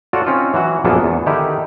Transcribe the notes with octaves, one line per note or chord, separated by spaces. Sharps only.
F4 F#4 A4 C#5 D5 F#5
C4 C#4 D#4 F4
E3 F#3 F#4
A#1 F#2 A#3 B3 G#4 A4
E2
D3 D#3 D#4 E4 G4